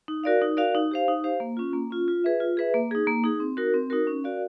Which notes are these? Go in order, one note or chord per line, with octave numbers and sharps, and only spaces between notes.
D#4
F#4 A#4 D5 F5
D#4
F#4 A#4 D5 F5
D#4
G4 C5 F5
D#4
G4 C5 F5
A#3
C#4 F4
A#3
C#4 F4
F4
G#4 B4 E5
F4
G#4 B4 E5
A#3
D#4 G#4
A#3
D#4 G#4
C4
D#4 F#4 A#4
C4
D#4 F#4 A#4
C#4
F#4 A#4 D5 F5